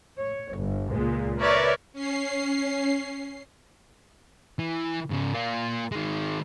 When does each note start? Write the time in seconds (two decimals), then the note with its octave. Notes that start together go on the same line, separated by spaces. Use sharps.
0.17 C#5
0.56 G1
0.90 C#2 A#2 G#3
1.40 A#4 B4 C#5 D5 E5
1.93 C#4 C7
4.59 E3
5.11 G#2 C#3
5.34 A#3 F4
5.92 D#3 G#3